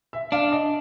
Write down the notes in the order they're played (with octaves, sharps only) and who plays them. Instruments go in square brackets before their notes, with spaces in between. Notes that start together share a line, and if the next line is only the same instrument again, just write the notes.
[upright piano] E5
[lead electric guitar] D4 [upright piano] F5
[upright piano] D#5